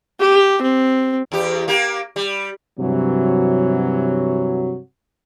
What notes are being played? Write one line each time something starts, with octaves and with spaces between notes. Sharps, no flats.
G4
C4
E2 G4
A#3 G4
G3
G2 C3 E3 F#3